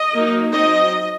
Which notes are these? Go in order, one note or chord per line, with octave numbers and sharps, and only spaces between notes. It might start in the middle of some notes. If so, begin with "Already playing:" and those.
Already playing: D#5
F#3 A#3 D#4
F#3 C4 D#4 D#5